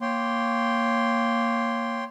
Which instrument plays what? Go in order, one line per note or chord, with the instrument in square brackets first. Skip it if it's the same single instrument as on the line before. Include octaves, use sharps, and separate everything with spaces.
[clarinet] A#3 [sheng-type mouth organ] C#5 G5 C6